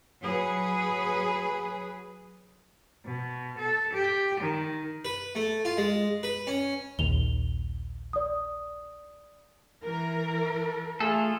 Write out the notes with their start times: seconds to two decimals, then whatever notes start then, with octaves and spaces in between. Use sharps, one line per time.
0.22 F#3 G#4 B4
3.05 B2
3.58 A4
3.94 G4
4.40 D#3
5.05 B4
5.35 A3
5.65 F4
5.77 G#3
6.23 B4
6.47 C#4
6.99 A#1 D#2 F7 G7
8.13 D5 D#6
9.82 E3 A#4
11.00 A3 F4 G#4 A4